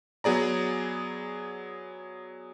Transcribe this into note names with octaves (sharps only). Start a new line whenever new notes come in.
F#3 B3 G#4 D5 A#5